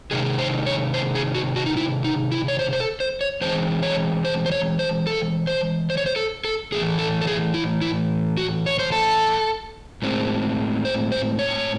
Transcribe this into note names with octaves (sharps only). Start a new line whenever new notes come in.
C3 D#3 G#3 G#4
C5
C#5
C5
G#4
F#4
F#4
D#4
E4
D#4
E4
C#5
C5
C5
A4
C5
C#5
E3 G#3 C4 C5
C#5
C5
C5
C#5
C5
A4
C5
C5
C#5
C5
A4
A4
A2 E3 A3 G#4
A4
A4
G#4
E4
E4
F#4
C#5
C5
A4
A2 G#3 C4
C5
C5
C#5